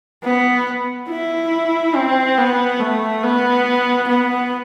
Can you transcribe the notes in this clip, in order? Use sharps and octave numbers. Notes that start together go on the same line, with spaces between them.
B3
E4
C4
B3
A3
B3
B3